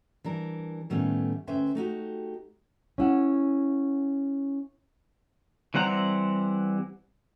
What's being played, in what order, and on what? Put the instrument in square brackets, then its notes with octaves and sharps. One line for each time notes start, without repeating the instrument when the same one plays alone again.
[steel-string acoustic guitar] E3 G3 D4 A#4
A2 D#3 G3 A3 B3 C#4
D2 C#4 B4 C5 E5 G5
A3 D#4 F#4 G4
[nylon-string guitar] C#4 E4 F#5
[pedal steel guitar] E3 G3 C4 F#5 A#5